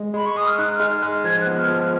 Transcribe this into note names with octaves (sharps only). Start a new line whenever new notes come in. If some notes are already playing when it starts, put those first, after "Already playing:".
Already playing: G#3
G#3 B5
C#6
G#3 D#6
F6
D#4 F#6
F6
G#3
F6
G#3
F3 G#6
F#6
B3
F6
F3
F6